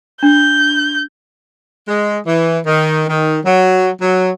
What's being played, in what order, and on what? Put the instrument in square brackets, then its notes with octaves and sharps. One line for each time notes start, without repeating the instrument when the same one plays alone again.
[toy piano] D4 [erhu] G6
[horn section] G#3
E3
D#3
D#3
F#3
F#3